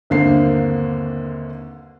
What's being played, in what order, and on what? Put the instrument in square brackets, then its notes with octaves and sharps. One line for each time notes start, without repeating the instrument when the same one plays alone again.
[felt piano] G1 D#2 D3 A#3 C4 C7